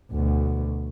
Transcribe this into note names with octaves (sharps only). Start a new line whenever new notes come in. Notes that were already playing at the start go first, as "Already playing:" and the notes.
D2 B2